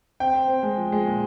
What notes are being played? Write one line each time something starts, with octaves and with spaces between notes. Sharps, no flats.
C4 G5
C4
C4
G#3
F3
G#3
A#2